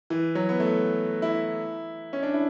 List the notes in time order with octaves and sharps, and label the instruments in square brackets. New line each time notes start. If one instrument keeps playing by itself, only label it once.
[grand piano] E3
F#3
B3
A3
E4
C#4
D4
E4